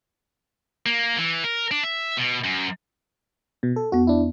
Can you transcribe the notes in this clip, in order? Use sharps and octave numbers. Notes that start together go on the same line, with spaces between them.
A#3
E3
A#4
D4
E5
B2
F#2
B2
A4
E2 B3 F#4
D4 E4